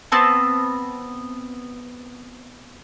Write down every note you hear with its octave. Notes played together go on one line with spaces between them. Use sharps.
B3 C4 A5